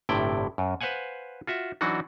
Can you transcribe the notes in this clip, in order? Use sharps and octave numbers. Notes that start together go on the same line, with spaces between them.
G1 A2 C3 E4 D5 G5
F#2
B4 C5 F5 F#5 G#5
F4 F#4 E5
E3 F#3 D4 D#4 F#4